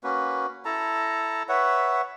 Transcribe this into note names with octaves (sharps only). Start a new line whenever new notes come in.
A#3 C#4 F#4 B4
E4 A4 A5 A#5
B4 C#5 E5 F#5